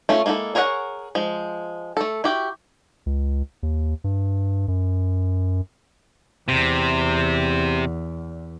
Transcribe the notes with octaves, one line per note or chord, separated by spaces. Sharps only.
A3 C#4 F4
G#3 A#3 E4 F#4 A4
G#4 A#4 C#5 D#5 F#5
F3 G#3
A3 A4
E4 F#4 G4
C#2
D#2
G2
F#2
E2 C3